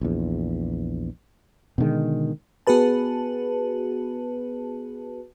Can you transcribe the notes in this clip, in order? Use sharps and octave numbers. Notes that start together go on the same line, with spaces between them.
A#1 E2
B2 D3 D#3 G#3
B3 F#4 G#4 B4 A5